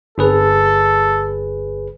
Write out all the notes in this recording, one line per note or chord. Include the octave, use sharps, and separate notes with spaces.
G1 G#4 A4 B4